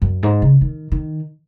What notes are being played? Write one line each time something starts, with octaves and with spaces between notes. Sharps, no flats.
F#2
G#2
C#3
D#3
D#3